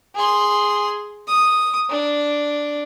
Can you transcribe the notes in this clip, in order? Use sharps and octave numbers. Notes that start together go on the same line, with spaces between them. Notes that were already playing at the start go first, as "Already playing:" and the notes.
G#4 C6
D#6
D4